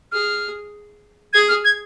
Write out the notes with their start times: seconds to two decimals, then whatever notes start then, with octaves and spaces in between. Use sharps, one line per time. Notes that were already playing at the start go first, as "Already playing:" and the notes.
0.12 G#4 F6
1.33 G#4 G#6
1.49 F6
1.64 G#6